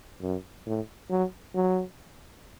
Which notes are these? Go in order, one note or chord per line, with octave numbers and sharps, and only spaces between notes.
F#2
A2
F#3
F#3